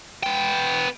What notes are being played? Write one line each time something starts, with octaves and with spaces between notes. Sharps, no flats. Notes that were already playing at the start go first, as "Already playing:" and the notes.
B3 G5